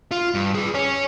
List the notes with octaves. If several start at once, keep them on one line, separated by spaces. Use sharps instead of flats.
F4
G2
G#4 B4
C#5 G#5